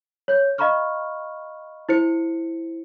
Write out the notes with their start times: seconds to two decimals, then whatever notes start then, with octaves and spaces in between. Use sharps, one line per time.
0.28 C#5 G6
0.58 D#5 F5 A#5 B5 C#6 F6
1.89 E4 C5 C#7